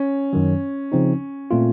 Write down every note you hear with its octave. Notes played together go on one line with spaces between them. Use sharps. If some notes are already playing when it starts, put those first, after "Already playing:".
Already playing: C#4
F#2 D#3 F#3
C#3 F3 C4 D#4
A#2 A3 C4 F4